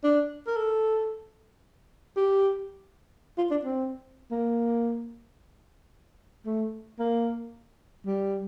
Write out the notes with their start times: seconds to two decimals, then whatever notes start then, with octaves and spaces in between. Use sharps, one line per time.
0.04 D4
0.47 A#4
0.57 A4
2.16 G4
3.38 F4
3.50 D4
3.65 C4
4.31 A#3
6.46 A3
6.99 A#3
8.06 G3